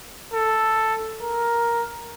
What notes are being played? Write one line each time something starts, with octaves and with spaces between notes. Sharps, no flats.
A4
A#4